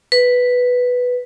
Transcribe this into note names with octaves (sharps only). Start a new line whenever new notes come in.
B4